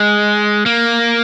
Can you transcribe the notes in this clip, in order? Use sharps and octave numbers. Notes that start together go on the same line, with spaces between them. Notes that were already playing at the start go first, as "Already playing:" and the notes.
Already playing: G#3
A#3